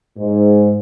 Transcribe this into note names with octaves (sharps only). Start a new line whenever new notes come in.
G#2